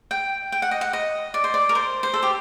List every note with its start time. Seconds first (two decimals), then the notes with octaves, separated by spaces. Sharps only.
0.11 G5
0.52 G5
0.62 F#5
0.71 D#5
0.81 F#5
0.93 D#5
1.34 D5
1.44 C5
1.54 D5
1.69 A#4
1.75 C5
2.03 C5
2.14 A4
2.23 G4